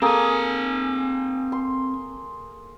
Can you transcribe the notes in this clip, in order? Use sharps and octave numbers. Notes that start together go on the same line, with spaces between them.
A#3 C4 G#4 A4 G#5
C6